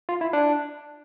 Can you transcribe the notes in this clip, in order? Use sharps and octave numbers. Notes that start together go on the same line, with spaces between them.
F4
E4
D4